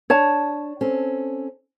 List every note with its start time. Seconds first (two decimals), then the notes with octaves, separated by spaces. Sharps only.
0.10 D4 C#5 A5
0.81 C4 C#4 A4